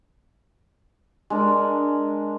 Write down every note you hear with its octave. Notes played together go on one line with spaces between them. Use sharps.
G#3 D4 A#4